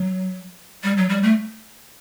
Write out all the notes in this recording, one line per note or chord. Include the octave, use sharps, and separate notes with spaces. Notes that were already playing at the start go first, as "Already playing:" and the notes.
Already playing: F#3
G3
F#3
G3
A3